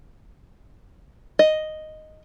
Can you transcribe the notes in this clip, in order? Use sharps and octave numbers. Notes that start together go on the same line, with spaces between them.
D#5